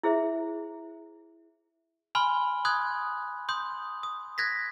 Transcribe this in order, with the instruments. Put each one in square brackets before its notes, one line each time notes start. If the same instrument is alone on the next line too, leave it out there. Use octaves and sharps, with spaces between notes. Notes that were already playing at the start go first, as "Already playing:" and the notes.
[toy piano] E4 G#4 C5 E5
[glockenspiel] G#5 B5 C6 F6 G7
C6 D#6 F#6 G#6
C6 D#6 G6
D#6
F#6 G#6 A#6 B6